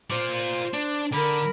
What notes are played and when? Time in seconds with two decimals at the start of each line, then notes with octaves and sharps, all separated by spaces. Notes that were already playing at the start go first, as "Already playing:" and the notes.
0.10 F4 C5 D5
0.73 D4
1.12 D3 A#4 B5